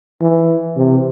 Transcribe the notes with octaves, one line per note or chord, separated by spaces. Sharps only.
E3
C3